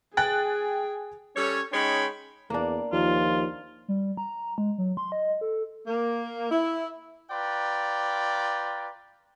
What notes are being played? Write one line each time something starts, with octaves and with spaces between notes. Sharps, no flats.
G#4 G5 G#5 F#6 A6
G3 C#4 A4 C#5
G#3 C#4 D#4 C#5 G5 B5
E2 A#3 D4
D#2 F3 F4
G3
A#5
G#3
F#3
C6
D#5
A4
A#3
E4
F4 B4 D5 G5 A#5